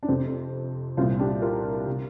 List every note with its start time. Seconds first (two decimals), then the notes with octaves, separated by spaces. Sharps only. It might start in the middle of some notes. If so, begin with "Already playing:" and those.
0.03 D4
0.08 F2 C3 C4
0.97 C2 C4 F4
1.01 A#2
1.19 D4 G4
1.42 F4 A#4
1.88 C3